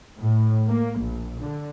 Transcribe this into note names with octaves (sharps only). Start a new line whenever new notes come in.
A2
A#3
A#1
D3